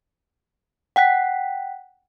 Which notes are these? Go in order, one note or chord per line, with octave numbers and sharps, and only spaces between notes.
F#5 G5 F#6 B6